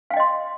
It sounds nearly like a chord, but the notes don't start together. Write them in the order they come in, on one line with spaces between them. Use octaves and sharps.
F5 G5 D#5 C6